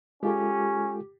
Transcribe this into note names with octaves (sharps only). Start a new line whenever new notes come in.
G#3 C#4 F4 G4 A4